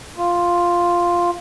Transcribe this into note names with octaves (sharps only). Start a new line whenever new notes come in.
F4